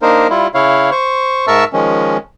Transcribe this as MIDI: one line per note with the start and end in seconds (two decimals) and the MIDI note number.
0.02 0.27 58
0.02 0.27 62
0.02 0.27 63
0.02 0.27 70
0.02 0.27 72
0.30 0.47 55
0.30 0.47 64
0.30 0.47 65
0.54 0.90 49
0.54 0.90 64
0.54 0.90 73
0.54 0.90 77
0.91 1.46 72
0.91 1.46 85
1.47 1.64 44
1.47 1.64 70
1.47 1.64 76
1.47 1.64 81
1.47 1.64 85
1.47 1.64 88
1.73 2.17 51
1.73 2.17 53
1.73 2.17 56
1.73 2.17 61